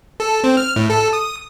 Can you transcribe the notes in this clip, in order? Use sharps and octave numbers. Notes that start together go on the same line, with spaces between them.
A4
C4
F6
A2
A4
D#6